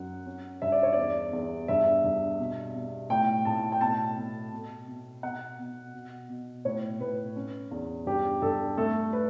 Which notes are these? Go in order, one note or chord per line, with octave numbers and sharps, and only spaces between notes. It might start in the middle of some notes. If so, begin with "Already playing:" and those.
Already playing: F#2 C#4 F#5
C#4
G2 E5
D5
C#5
E2 D5
E2
G2 E5
G2
B2
B2
A2 G5
A2 A5
G5
B2 A5
B2
B2
B2
B2 F#5
B2
B2
B2
A2 C#5
A2 B4
C#4
E2
G2 G4
G2 A4
A3 A4
B4